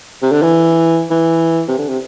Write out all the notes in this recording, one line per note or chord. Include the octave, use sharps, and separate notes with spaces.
C3
D3
E3
E3
C3
D3
C3